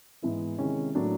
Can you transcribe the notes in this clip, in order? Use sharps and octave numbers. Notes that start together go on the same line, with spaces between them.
G#2 E3 G#3 B3 E4
C3 D#3 G#3 C#4 E4
A2 F#3 A#3 D4